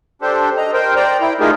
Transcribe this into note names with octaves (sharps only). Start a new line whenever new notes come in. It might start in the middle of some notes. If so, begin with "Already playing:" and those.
D4 G4 A4 C5
D#5 A#5
A#4 C5 G5
C5 D5 G5 A#5
E4 G5
A3 D#4 F4 G4 G#4 A#4